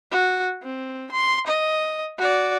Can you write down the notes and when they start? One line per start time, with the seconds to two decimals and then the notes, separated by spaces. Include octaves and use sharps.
0.12 F#4
0.63 C4
1.11 C6
1.47 D#5
2.18 F#4 D5